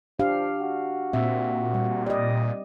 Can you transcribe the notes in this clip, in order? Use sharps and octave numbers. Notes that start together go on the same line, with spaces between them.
F3 D4 G4 F5
F#4
A#2 C4 E5
G3
G3 D5 D#5